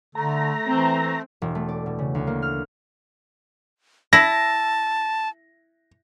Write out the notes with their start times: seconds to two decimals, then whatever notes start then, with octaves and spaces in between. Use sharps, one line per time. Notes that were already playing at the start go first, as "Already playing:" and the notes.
0.15 D3 A3 A#5
0.67 E3 C4
1.42 E1
1.55 A3
1.68 D5
1.86 B2
1.99 C#3
2.15 D2
2.27 A#3
2.42 F6
4.13 E4 A5 A#6